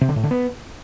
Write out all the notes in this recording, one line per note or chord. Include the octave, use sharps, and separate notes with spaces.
C3
D3
A2
D3
B3